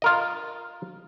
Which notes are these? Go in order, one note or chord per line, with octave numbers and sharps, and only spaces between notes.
F4 A#4 D#5